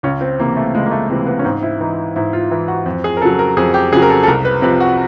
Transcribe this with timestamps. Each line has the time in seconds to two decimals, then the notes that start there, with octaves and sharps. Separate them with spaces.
0.03 C#2 C#4
0.21 C4
0.39 C3 E3 A#3
0.57 A3
0.74 C#2 G#3
0.86 A#3
0.91 A3
1.09 C3 E3 A3
1.27 B3
1.39 C#4
1.45 G#2 C4
1.63 E4
1.80 E3 D#4
2.16 G#2 E4
2.33 F4
2.51 E3 E4
2.68 F#4
2.86 F2
3.04 G#4
3.17 A#4
3.21 C#3 F#3 A4
3.39 A#4
3.57 F2 G#4
3.74 G4
3.92 C#3 G#4
3.97 F#3
4.02 A#4
4.10 A4
4.23 A4
4.27 C2 A#4
4.45 B4
4.62 C3 F3 B4
4.80 F#4